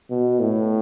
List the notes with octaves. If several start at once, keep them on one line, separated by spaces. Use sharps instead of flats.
B2
A2